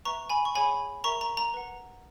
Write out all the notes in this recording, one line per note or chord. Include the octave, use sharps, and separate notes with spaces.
B4 E5 A#5 C#6
G#5 B5
C#6
G#4 C#5 F#5 G#5 B5
A#4 E5 A#5 C#6
A#5
A#5
B4 F#5